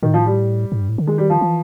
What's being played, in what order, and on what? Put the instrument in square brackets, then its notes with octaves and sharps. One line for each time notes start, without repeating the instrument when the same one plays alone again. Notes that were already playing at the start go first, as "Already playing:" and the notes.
[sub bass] A2 [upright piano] D#3
[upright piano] F3
G3
[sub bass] G#2
G2
A2
D3
[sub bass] D#3 [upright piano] G#3
[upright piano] G3
F3
[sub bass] E3